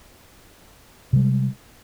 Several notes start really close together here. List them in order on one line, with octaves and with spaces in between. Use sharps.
C3 G3 G#3